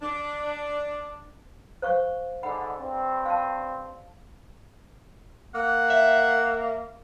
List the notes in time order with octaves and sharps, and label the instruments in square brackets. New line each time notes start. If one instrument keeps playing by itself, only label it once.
[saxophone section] D4
[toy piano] C5 F5 C#6
[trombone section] G#2 D3 [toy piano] F#5 B5
[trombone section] G2 C4
[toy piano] F5 A5
[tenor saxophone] A#3 [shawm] F#5
[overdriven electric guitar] E5